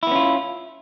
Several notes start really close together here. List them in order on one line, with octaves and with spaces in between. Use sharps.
E4 B3 C#4 F4